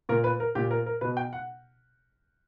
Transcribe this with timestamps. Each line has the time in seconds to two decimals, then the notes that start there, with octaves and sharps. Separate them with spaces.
0.09 A#2 A#4
0.24 B4
0.40 A#4
0.55 A#2 G4
0.71 A#4
0.86 A#4
1.01 B2 B4
1.17 G5
1.33 F#5